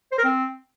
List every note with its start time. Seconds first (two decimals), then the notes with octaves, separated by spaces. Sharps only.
0.12 C5
0.18 A#4
0.24 C4